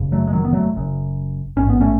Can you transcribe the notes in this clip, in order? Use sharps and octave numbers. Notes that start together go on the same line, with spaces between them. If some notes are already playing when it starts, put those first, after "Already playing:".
Already playing: F#1 F#2 C#3
F#3 A3
G#3
D#3 F#3
B3
F#3 A3
F#1 F#2 C#3
A1 G#2 C#4
B3
A3 C#4